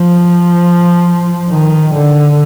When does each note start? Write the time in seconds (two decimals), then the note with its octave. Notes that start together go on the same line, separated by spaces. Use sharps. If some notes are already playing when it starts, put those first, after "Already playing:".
Already playing: F3
1.50 D#3
1.94 D3